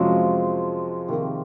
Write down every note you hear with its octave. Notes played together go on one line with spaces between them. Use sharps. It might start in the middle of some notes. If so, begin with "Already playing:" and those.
Already playing: F2 C3 F3 F#3 G#3 C#4 F4
C3 D#3 A#3